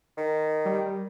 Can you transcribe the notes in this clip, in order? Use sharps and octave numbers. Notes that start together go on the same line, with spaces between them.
D#3
G3